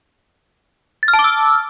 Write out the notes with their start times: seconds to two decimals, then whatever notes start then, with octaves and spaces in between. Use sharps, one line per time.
1.03 A6
1.08 F6
1.14 A5
1.19 D6
1.24 E6